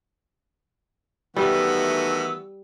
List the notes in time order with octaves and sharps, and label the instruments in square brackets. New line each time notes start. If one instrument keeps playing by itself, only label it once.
[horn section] D#3 B3 F#4 [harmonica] E3 A3 [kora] G3 [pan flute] E6